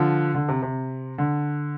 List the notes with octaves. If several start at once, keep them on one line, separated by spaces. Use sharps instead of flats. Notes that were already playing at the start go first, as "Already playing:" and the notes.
Already playing: D3 F3
D3
C3
C3
D3